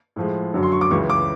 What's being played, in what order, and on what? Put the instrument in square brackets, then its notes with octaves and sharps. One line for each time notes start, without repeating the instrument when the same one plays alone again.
[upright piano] A2 F3 G#3
F#2 D3 F#3
C6
C#6
D6
C#2 C#3 E3 G#3 C#6
D6